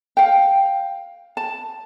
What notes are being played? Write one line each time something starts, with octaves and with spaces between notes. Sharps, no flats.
F5 G5
A5